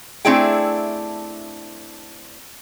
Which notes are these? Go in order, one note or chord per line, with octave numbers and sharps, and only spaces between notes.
A3 C4 D4 E4 G#4 G5